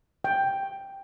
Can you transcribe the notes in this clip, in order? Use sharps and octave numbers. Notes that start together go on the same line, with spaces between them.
G5